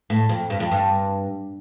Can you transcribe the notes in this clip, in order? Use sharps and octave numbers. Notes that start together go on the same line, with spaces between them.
A2
F2
G2
F2
G2